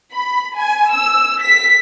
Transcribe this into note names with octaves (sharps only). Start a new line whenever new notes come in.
B5
G#5
E6
B6